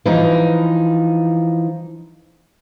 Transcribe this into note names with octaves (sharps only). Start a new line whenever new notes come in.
E3 F3 D#4